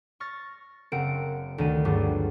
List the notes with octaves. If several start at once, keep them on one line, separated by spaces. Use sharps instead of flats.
C#6 F6 A6 A#6
F#1 C4 A#4 F#5 D7
D2 D#3 D#7
G2 F#3 G3 D4 F4 G#4